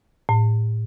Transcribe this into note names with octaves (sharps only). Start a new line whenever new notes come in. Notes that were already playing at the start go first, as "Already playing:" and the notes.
A2